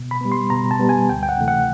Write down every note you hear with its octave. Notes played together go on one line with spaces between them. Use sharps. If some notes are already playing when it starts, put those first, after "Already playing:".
Already playing: B2
B5
G3 B3
C6
B2 A#5
A5
G3 B3
G#5
D2 G5
G5
F#5
C3 E3 A3
F#5